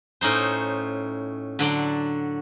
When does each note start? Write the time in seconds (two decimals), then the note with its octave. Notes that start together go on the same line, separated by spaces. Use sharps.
0.21 A2 C#4 D#4 C5
1.59 D3 F#3 D5 C6